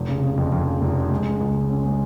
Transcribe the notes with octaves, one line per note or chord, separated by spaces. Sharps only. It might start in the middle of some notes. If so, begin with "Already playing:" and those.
Already playing: F1
C#3
C#3
F2
F2
C#3
F1
C#3
G#3
C#3
C#2
G#3
C#4
G#3